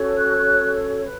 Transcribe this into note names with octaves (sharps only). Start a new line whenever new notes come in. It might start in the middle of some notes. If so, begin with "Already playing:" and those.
Already playing: C#4 F#4 A4 C#5
F#6
B4